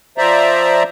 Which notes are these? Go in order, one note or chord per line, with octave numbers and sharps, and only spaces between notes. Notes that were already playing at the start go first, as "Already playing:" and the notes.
F3 C5 D5 E5 A#5